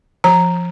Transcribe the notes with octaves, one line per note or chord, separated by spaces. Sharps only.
F3 A#5